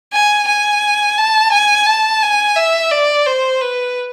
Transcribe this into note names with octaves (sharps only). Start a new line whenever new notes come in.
G#5
G#5
A5
G#5
A5
G#5
E5
D5
C5
B4